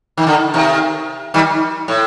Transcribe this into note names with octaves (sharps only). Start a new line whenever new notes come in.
D#3
D3
C3 D#3
D#3 G3
A2